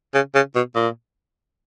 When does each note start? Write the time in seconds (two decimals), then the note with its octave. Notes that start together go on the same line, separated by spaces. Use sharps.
0.14 C#3
0.35 C#3
0.55 B2
0.75 A#2